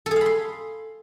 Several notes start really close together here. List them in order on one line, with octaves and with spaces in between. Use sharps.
A4 G#4 F5 B5 C6